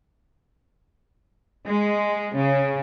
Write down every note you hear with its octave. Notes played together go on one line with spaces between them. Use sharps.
G#3
C#3